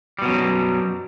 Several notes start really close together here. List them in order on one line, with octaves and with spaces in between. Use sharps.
G3 B2 F#3 F#2